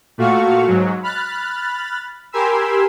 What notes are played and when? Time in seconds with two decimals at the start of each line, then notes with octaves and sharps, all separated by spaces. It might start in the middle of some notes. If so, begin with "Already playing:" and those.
0.18 A#2 A3 F#4 F5 C#6
0.67 G#2 F#3
1.03 B5 F6 F#6 A6
2.32 G4 A#4 G#5 B5 C6 E6